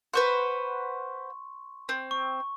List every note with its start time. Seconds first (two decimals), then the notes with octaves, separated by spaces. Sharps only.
0.14 B4 C5 F#5 C6 C#6
1.89 C4
2.11 C#6